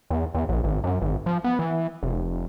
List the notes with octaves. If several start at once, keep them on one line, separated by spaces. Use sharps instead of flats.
E2
E2
A#1
G#1
F#2
G#1
F3
B3
E3
F1